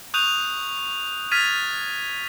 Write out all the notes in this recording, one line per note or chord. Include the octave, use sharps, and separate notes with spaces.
C#6 D#6 F#6 G6 D#7 F7
F6 G#6 A6 B6 D#7 F7